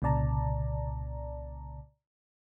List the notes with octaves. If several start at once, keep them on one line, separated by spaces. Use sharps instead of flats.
C2 A#2 C#3 D5 A5 A#5